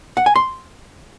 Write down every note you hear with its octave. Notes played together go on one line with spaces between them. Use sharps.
F#5
G#5
C6